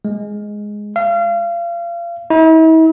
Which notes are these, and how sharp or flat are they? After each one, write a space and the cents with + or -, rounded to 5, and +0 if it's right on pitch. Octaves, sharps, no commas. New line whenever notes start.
G#3 +0
F5 -30
E4 -45